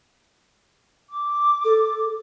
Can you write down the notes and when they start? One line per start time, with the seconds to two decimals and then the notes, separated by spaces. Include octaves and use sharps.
1.10 D6
1.65 A4